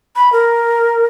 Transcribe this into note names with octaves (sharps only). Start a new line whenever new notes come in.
B5
A#4